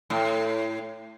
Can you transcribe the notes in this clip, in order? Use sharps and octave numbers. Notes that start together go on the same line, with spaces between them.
A2